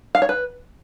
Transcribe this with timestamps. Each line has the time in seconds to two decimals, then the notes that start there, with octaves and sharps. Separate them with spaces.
0.15 F5
0.22 C#5
0.29 B4